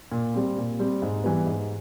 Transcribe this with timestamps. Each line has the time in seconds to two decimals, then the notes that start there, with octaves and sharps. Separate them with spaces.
0.12 A#2
0.34 G3 C4
0.57 A#2
0.79 G3 C4
1.02 G#2
1.24 E3 G3 B3
1.47 G#2